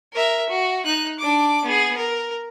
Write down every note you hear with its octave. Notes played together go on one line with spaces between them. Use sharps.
A#4 E5
F#4
D#4 F#6
D4 D6
B3 G#4
A#4